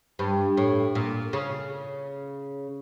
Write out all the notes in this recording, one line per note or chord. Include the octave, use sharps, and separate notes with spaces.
G2
A2
A#2
C#3